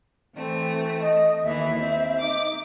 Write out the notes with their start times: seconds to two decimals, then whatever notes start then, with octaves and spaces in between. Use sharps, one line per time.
0.36 E3 A3 C4
1.01 D#5
1.44 D#2 E3 E5
1.79 C4
2.21 D#4 D6